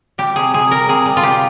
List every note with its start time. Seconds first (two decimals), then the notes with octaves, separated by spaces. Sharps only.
0.18 G3 G4
0.36 C3 G#4
0.54 C3 G#4
0.71 G3 A#4
0.89 C3 G#4
1.06 G3
1.17 F4
1.23 C3 G4